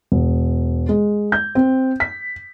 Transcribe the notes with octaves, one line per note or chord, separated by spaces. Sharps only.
E1
G#3
G6
C4
B6